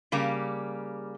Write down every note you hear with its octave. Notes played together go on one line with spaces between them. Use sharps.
C#3 G3 A#3 G4